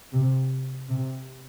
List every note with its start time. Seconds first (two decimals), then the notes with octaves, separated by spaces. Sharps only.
0.12 C3
0.89 C3